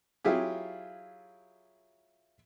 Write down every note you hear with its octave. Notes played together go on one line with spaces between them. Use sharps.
F#3 E4 F4 G4 G#4